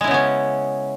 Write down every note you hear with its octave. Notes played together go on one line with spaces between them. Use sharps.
C#3 G#3 B3 C#4 E4